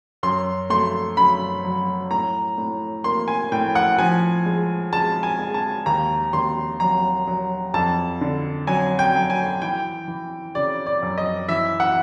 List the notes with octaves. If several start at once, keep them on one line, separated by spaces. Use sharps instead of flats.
F#2 C6
A3 C6
F#2 B5
F#3
A2 A#5
A2
A#3 C6
G#5
A2 G5
F#5
F3 G#5
G#3
G#3 A5
G#5
G#3
A5
D#2 A#5
D#2 C6
F#3 A#5
F#3
F2 A5
D3
F#3 G#5
G5
F#3
G#5
E3 G5
E3
C#3 D5
D5
F#2
D#5
E3 E5
F#5